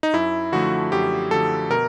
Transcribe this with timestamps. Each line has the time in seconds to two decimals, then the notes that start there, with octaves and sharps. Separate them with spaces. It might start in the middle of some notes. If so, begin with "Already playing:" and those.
0.03 D#4
0.13 F#2 E4
0.52 D3 F3 A3 F#4
0.92 F#2 G4
1.31 D3 F3 A3 A4
1.70 B2 A#4